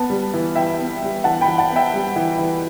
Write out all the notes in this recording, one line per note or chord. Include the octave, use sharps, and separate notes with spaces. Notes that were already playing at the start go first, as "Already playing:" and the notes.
Already playing: B3 A5
G3
E3
E3 E5 G5
B3
G3
E3 F#5 A5
G5 B5
E3
F#5 A5
B3
E5 G5
G3
E3
E3